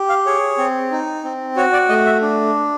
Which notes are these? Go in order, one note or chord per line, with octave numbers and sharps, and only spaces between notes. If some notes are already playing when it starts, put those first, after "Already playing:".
Already playing: G4
F5
G#4 C#5
C4
D#4
C4
F#4 C#5
D5
A3 D#5
E5
D4